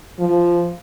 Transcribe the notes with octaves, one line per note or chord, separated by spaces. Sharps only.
F3